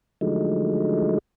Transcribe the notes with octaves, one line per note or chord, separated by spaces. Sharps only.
D3 F3 F#3 G#3 A3 D#4